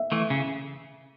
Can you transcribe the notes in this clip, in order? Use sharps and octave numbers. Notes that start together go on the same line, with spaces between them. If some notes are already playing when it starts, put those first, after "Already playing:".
Already playing: E5
E3 A3
C#3